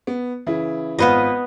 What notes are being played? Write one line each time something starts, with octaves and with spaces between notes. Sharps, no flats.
B3
C#3 E3 E4
G#1 B3 F4 B4 D#5